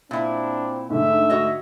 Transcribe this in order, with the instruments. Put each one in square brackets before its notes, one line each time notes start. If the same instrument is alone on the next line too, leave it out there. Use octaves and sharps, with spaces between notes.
[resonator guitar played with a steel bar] A#2 E4 [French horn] C4 [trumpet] D4
[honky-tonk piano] G#2 D3 [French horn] A3 [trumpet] E5
[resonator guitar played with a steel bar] F#4 C#5 D#5